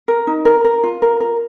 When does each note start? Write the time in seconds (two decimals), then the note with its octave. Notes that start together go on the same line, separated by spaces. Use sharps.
0.08 A#4
0.27 D#4
0.45 A#4
0.64 A#4
0.83 F4
1.02 A#4
1.20 A#4